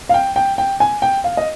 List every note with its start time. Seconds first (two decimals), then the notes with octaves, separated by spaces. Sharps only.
0.09 F5
0.14 G5
0.36 G5
0.58 G5
0.80 G#5
1.02 G5
1.24 F5
1.37 D#5